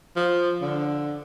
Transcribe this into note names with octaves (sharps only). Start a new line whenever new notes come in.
F3
D3